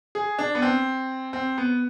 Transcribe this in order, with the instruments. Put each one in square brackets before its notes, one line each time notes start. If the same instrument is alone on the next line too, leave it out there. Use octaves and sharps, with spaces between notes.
[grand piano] G#4
D4
B3
C4
C4
B3